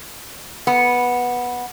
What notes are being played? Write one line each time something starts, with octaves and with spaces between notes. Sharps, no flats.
B3